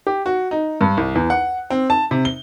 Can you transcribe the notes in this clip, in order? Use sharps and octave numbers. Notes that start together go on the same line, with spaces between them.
G4
F#4
D#4
G2
C2
E2
F#5
C4
A5
C3
G7